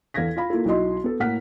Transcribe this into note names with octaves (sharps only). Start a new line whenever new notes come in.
E2 A4 F5 G#6 A#6 B6
F4 F5 B5
A#3 E4 F4 A4
B1 E4 F#4 D#5 C6
B3 A4
A2 A#3 F#5 F6 B6